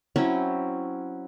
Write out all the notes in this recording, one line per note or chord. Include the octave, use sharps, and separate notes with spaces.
F#3 C4 C#4 E4